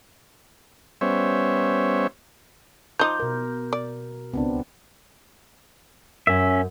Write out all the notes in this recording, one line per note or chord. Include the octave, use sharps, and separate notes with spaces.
G3 B3 C#4 C5 C#5 E5
F3 D#4 A#5 C6 D6 G6
B2 A#4
D5
C#2 B3 C4 D4
F#2 C#4 E5